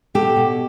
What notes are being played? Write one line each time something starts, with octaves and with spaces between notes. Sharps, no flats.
B2 G4 A4
B2